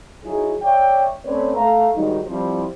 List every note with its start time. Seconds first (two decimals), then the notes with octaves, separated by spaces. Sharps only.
0.24 F#3 D#4 E4 G#4
0.62 C#5 D5 E5 G5
1.25 A3 C4 C#4 B4 C#5 D5
1.56 A3 F5 A#5
1.95 G#2 D#3 F#3 G3 D#4
2.27 F3 G3 C4 E4 C5